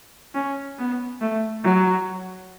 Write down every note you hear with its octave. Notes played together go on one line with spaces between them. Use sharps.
C#4
B3
A3
F#3